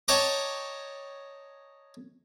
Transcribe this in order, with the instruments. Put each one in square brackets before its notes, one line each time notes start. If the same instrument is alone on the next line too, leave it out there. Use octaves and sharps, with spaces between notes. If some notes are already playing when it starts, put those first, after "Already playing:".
[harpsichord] C#5 D#5 G5 A5 A#5 D6